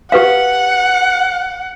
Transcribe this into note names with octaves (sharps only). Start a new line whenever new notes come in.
G4 B4 F5 F#5